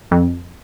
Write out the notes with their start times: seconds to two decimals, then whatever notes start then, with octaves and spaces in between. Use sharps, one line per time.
0.11 F2